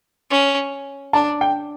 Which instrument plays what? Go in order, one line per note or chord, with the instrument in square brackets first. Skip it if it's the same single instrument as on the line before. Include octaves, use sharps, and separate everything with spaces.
[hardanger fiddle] C#4
[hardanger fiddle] D4 [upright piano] A5
[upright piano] G5